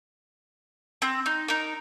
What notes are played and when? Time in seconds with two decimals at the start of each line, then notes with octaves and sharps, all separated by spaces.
1.02 C4
1.26 D#4
1.48 D#4 A#4